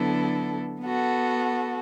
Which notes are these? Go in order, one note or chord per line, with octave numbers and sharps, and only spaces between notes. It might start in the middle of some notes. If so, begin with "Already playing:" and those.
Already playing: D3 F#3 B3 E4 A4
B3 F#4 A4